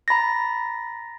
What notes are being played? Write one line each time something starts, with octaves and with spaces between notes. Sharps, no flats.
A#5 B5 A6 A#6